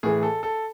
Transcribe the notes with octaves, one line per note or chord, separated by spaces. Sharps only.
A2 E3 G#4
A4
A4